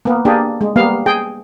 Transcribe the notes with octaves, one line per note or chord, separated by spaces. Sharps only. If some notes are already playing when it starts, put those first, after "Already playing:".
A#3 B3
A#3 D4 G4 G#4
G#3
G3 A#3 B3 F5
G#4 G5